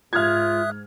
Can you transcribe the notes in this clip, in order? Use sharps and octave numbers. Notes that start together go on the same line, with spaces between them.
G#2 F4 E5 D#6 F6 F#6 G#6